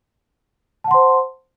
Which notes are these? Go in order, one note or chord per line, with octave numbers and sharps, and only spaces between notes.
C5 F#5 A5 C6